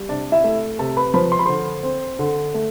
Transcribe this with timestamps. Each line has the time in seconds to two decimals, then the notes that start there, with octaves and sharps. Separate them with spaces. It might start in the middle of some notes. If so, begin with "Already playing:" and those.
Already playing: G3
0.09 C3 D4 D5
0.32 E4 E5
0.44 A3
0.79 C3 A4 A5
0.97 B4 B5
1.14 F3 B4 B5
1.32 C6
1.39 B5
1.46 D3 C5 C6
1.83 C4
2.19 D3
2.54 A3